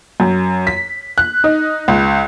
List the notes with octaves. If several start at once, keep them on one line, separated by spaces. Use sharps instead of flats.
F#2
B6
F#6
D#4
C#2